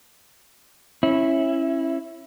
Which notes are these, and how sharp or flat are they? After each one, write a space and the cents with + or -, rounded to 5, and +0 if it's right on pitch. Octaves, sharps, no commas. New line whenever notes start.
C#4 -25 E4 +0